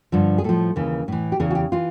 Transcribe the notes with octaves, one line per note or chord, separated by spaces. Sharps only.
G2 D3 F3
G#4
A2 F3 A4
D#2 C#3 E3
A2 E3
G4
E2 C#3 E3 G#4
F#4
G4
E3 F4